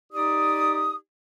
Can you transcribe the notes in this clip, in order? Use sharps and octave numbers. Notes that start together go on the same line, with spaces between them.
D#4 G4 D5 D#6